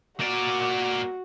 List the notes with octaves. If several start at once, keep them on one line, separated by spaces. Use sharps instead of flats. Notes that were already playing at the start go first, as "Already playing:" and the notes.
A#3 F#4 D5